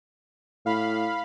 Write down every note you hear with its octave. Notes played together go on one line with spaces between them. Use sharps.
A2 F5 B5